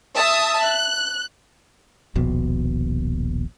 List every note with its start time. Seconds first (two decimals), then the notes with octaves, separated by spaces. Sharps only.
0.16 E5 A5 D#6
0.63 F#6
2.15 D#1 A#1 B2